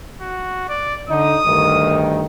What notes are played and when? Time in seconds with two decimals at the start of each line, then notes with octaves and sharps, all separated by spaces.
0.21 F#4
0.69 D5
1.09 D3 D#4 D#6
1.45 D2 G2 D#3